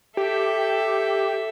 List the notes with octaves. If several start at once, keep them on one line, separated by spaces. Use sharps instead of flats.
G4 A4 E5